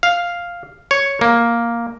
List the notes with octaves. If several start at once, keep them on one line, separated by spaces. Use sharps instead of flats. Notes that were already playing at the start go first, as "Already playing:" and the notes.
F5
C#5
A#3